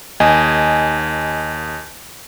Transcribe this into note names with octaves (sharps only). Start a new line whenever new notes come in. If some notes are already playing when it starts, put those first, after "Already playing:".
D#2 D#5 G#5